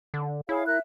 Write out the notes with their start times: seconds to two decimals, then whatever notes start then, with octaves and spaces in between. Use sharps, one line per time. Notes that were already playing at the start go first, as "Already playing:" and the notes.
0.14 D3
0.49 E4 G#4 C#5 F5
0.66 A#4 E5 F#6